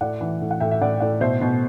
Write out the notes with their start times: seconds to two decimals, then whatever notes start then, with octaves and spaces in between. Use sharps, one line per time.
0.01 A2 D5 F#5
0.21 E3
0.41 A2
0.51 F#5
0.60 A2 E5 G5
0.71 E5
0.82 A2 D5 F#5
1.00 A2 D5 F#5
1.21 B2 C5 E5
1.41 B2